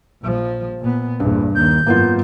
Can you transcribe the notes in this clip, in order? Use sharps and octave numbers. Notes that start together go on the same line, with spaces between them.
A#1 F3
A#2 B3
A#1 E2 G2
D#2 D#3 G6
G#1 F#2 A#3 B3 F4